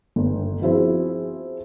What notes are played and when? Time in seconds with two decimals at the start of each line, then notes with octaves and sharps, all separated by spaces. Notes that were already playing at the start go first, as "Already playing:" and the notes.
0.16 G1
0.62 F3 C4 E4 F#4 G#4 C5